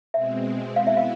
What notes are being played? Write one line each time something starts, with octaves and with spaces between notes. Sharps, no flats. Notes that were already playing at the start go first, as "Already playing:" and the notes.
B2 G#3 C4 E5
B2 B3 E4 F5
E5
F5